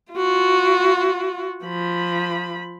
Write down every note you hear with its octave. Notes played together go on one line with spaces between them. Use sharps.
F4 F#4
F3 B5